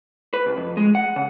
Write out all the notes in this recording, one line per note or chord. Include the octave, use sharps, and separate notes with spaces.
B4
C2
F2
G#3
F#5
C#3